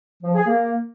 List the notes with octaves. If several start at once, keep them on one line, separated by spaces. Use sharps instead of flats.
F3
G#4
A#3